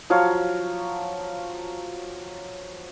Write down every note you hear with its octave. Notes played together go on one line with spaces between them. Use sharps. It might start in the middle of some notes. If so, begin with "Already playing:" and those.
F3 F#3 C#5 F5